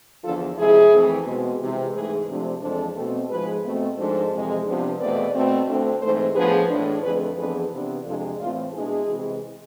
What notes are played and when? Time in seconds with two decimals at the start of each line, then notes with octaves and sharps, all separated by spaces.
0.24 E2 D3 F3 F4 A4
0.58 F2 C3 G#3 E4 G#4
0.92 F2 E3 A3 C4
1.26 B2 G#3 C4
1.61 C3 E3 G#3
1.94 G#2 E3 A3 G#4 B4
2.28 C3 F3 A3 D4
2.62 F2 E3 G#3 D4 A4 C5
2.96 B2 A3 C4
3.30 G#2 F3 G#3 G#4 B4
3.64 B2 A3 C4
3.98 G#2 F3 G#3 D4 A4 C5
4.32 F2 C3 E3 G#3
4.66 C3 F3 B3 D4
5.00 E2 B2 A3 C4 B4 D5
5.34 B2 A3 C4
5.67 D2 D3 A3 C4
6.02 G#2 E3 A3 C4 A4 C5
6.35 A2 F3 B3 D4 G#4 B4
6.70 A2 E3 G#3 D4
7.03 F2 D3 A3 G#4 B4
7.37 F2 E3 B3 D4 G#4 B4
7.72 C3 E3 B3 D4
8.05 F2 C3 G#3 D4 F4 A4
8.39 A2 E3 A3 C4 F4
8.73 B2 G#3 D4 E4 G#4
9.07 C3 E3 G#3